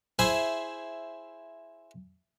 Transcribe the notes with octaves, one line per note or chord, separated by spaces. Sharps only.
E4 G#4 C5 E5